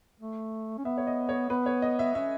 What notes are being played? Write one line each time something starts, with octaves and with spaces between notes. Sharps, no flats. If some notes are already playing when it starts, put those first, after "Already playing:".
A3
C#4
B3 E5
C#5
D#5
C#5
B3 B4
C#5
D#5
E5
C#4 E5